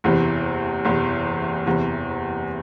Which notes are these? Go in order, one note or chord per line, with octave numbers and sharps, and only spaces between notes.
F#1 E2 C3 E3
F#1 E2 C3 E3
F#1 E2 C3 E3